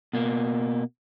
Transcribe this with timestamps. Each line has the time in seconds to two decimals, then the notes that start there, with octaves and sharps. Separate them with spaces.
0.13 B2 A#3